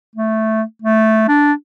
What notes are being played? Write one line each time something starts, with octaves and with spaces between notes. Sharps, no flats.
A3
A3
D4